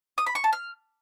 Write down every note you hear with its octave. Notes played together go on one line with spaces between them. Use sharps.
D#6
B5
C#6
A5
F6